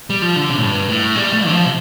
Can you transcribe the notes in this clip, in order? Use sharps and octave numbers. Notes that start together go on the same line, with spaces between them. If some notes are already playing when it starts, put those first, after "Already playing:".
G3
F3
D3
C3
A2
G2
A2
G3
A3
D3
F3
C3